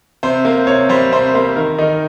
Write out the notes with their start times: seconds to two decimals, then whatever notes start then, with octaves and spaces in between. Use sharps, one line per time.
0.23 C3 C5
0.45 A#3 C5
0.67 C3 C#5
0.89 G3 C5
1.12 C3 C5
1.34 A#3 C5
1.56 D#3 A#4
1.79 D#3 D#4